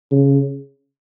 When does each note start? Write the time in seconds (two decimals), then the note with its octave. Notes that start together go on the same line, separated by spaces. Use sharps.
0.11 C#3